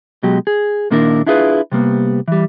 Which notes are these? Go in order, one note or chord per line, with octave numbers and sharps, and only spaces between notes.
B2 F#3 G#3 G4
G#4
A#2 D#3 A#3 D4 E4 A#4
D4 E4 F4 G#4 A4 B4
C3 G3 A#3 B3
E3 G3